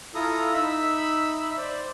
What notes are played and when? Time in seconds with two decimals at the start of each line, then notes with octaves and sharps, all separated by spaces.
0.15 E4 F4 A4 A#5 D#6
0.54 D#4 E5 B5 E6
1.57 C5 D5